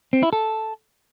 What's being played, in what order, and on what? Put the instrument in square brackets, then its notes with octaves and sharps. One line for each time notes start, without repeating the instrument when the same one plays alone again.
[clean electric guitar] C4
E4
A4